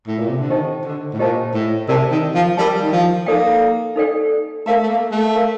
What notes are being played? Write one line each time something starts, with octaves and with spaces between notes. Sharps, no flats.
A2
A#2
C3
D3
D#3 G4 C5 D#5 A5
D3
A2
A#2 G4 C5 D#5 A5
A2
C3 A#4 D5 A5
D#3
F3
G3 A#4 D5 A5
D#3
F3
A#3 D#4 A4 D5 G5
D#4 A4 D5 G5
A3 A#4 F5 A#5
A3
A#3
A3
A#4 F5 A#5